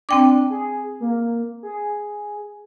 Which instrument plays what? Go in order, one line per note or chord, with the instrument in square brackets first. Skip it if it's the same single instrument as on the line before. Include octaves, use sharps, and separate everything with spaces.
[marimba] C4 G5 D6 [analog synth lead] D4
[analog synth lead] G#4
A#3
G#4